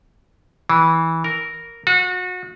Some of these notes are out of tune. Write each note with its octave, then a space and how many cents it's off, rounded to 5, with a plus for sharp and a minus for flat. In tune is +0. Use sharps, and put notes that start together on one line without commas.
E3 -15
A#4 -5
F#4 -30